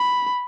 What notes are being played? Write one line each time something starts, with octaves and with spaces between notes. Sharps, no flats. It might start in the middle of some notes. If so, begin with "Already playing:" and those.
Already playing: B5